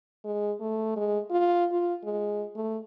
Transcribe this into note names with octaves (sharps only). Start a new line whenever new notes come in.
G#3
A3
G#3
F4
F4
G#3
A3